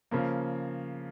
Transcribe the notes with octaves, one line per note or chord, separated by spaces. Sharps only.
C#3 F3 A#3